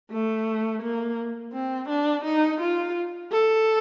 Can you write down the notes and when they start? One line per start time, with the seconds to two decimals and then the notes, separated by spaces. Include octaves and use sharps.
0.11 A3
0.82 A#3
1.53 C4
1.89 D4
2.25 D#4
2.61 F4
3.32 A4